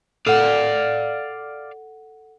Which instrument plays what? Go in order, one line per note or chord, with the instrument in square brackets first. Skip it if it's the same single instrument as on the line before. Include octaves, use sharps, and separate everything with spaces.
[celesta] A4 F#5 [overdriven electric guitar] D5 F5